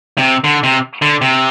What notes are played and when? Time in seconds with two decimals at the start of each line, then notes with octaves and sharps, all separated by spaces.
0.18 C3
0.44 D3
0.63 C3
1.02 D3
1.21 C3